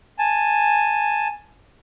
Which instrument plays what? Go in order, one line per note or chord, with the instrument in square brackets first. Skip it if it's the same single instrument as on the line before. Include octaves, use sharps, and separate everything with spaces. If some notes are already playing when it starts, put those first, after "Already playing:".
[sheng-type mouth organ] G#5 A5